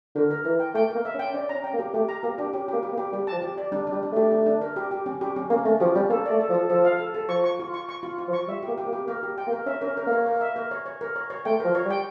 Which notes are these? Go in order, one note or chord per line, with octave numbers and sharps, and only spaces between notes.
D3 A#4
A#4
E3 A#4
G5
A3 G5
A#3 A#4
E5
C#4
G5
C#4 D5
C#4 A#5
G5
A#3
G4
A3 G4
A#5
A#3 G4
D4 G4
C#4 G4
A#3 G4
G4
A#3
G4
G3 G4
F3 A5
G4
D5
G3 D4
D4
G3
D4
A3 G4
D4
D4
A#4
G4
G4
C#4
G4
C#4
A#3 C#4
A3 C#4
F3 G4
G3 C#4
A#3 A4
A3 D5
A4
F3
A4
F3 A4
F5
A4
A4
F3 C#6
C#6
F4
C#6
C#6
F4
F4
F3
C#6
G3 E5
G4
A#3
G4
A#3
G4
A#3 A#4
G4
G5
A#3
A#4
C#4 E5
A#4
C#4
A#4
A#3 C#5
A#4
E5
A#4
C#5
C#5
A#4
C#5
C#5
A3 G5
F3 A#4
C#5
G3
G5